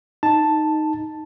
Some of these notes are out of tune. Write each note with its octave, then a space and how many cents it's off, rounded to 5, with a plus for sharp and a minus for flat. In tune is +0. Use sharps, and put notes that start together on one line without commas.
D#4 +0 A5 +0